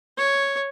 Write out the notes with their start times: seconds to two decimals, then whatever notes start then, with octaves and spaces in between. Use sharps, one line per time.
0.18 C#5